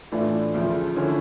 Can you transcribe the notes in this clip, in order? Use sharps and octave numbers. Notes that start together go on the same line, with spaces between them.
A2 E3 A3 D4 F4
D2 C#3 F3
D3 F3 C#4 E4